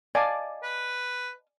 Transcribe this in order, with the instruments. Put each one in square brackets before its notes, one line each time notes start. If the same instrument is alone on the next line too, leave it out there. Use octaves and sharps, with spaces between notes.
[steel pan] D5 G#5 D6 [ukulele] D#5 F5 A5
[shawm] B4